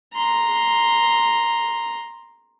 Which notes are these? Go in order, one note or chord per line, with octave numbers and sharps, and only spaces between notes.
A#5 C6